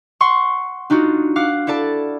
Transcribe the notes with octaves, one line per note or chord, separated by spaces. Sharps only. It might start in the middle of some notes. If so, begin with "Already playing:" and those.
F#5 C6 C#6
D4 D#4 F4 F#4
F5 F#5 D6 F#6
E4 A4 D5 A5